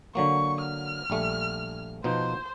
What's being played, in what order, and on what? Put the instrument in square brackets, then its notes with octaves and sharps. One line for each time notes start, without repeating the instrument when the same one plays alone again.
[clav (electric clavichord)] D3 F#3 A#3 [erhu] C#6
[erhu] F6
[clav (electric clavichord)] A#1 G3 A3
[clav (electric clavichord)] B2 F3 D#4 [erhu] C5